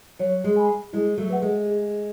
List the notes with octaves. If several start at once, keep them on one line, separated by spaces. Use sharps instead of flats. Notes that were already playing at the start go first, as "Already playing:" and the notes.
F#3 C#5
G#3
G#5 B5
G#3 E4
F#3 A3
B4 F#5
G#3
G#4